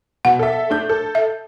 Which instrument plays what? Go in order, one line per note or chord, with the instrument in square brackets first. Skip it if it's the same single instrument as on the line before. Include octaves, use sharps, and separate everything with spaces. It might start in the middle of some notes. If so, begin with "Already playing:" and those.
[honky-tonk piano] B2 [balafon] F#5
[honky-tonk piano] A4 E5
A3 D4 G6
A4
[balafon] E5